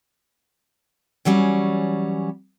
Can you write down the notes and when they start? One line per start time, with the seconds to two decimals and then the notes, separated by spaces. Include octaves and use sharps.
1.25 E3 F#3 G3 C#4